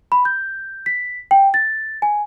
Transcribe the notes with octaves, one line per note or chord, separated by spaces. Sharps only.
B5
G6
B6
G5
A6
G#5